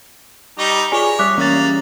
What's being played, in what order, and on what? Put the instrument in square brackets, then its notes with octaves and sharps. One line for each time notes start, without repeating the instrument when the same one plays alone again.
[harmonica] G3 D#4 [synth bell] C#6
[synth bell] F4 G#4 D5 [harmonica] C#5 [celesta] G#5
[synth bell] G3 G4 D#6 [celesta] D6 F#6 B6
[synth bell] E3 G3 [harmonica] A#3 [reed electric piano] C#4 A6